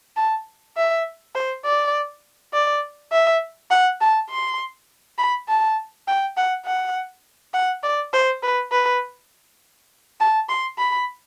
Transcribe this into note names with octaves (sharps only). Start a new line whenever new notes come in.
A5
E5
C5
D5
D5
E5
F#5
A5
C6
B5
A5
G5
F#5
F#5
F#5
D5
C5
B4
B4
A5
C6
B5